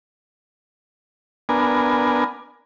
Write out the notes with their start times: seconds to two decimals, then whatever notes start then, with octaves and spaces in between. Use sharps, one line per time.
1.49 B3 D4 A#4 G#5